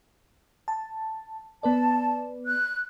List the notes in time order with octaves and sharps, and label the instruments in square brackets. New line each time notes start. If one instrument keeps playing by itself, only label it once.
[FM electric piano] A5
[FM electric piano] B3 B4 D5 [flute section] A5
[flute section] F#6